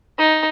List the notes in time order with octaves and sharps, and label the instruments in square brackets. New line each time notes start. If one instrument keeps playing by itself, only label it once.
[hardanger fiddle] D#4